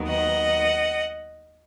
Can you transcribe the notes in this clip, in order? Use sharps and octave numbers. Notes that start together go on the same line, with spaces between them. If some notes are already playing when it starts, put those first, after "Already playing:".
Already playing: D#2 D#3 F#3 B3
D#5 F#5